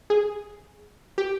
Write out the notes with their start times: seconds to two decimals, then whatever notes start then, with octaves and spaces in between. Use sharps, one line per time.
0.10 G#4
1.18 G4